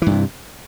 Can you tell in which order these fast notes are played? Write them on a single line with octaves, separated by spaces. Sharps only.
E3 G2 C3